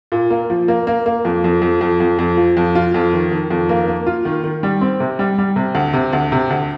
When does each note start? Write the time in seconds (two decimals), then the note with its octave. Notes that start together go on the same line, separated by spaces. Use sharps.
0.12 A#2
0.30 A#3
0.50 F3
0.68 A#3
0.87 A#3
1.06 A#3
1.25 F2
1.44 F2
1.62 F2
1.81 F2
2.00 F2
2.19 F2
2.37 F3
2.57 F2
2.75 F4
2.94 F2
3.13 D#3
3.31 D#3
3.51 F2
3.69 A#3
3.88 A#3
4.07 F4
4.25 D#3
4.44 D#3
4.63 G3
4.81 C4
5.00 C3
5.19 G3
5.38 G3
5.56 C3
5.75 D2
5.93 C3
6.13 D2
6.32 C3
6.50 D2